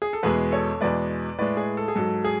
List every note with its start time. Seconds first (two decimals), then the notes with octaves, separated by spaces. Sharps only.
0.02 G#4
0.13 A4
0.23 E2 B2 G#3 G#4 B4
0.52 A4 C#5
0.81 E2 B2 G#3 B4 D5
1.38 A2 G#3 B4 D5
1.57 G#4 B4
1.77 A4
1.88 G#4
1.95 G#2 F#3 A4
2.25 G#4